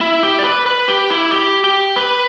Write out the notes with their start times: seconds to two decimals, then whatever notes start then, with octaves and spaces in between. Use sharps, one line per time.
0.01 E4
0.23 G4
0.39 D5
0.44 B4
0.66 B4
0.88 G4
1.10 E4
1.31 G4
1.64 G4
1.96 B4